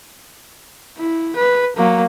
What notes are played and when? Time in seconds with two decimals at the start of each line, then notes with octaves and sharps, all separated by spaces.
0.98 E4
1.36 B4
1.77 F#3 A#3